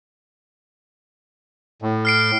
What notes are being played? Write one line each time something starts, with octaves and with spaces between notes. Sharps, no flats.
A2
F6 C7 D7